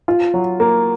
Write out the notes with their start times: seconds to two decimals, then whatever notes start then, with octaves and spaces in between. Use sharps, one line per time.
0.08 F4
0.34 F#3
0.60 A#3